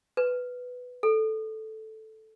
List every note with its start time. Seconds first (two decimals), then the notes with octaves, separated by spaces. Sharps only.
0.17 B4
1.03 A4